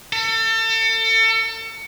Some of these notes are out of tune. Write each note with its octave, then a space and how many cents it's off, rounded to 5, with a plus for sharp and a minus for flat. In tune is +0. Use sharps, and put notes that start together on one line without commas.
A4 +35